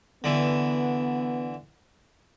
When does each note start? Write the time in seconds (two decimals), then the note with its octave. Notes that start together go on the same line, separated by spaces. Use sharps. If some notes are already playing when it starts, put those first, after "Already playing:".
0.24 D3 E3 B3